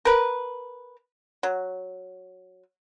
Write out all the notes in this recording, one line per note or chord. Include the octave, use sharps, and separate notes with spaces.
A#4 B4
F#3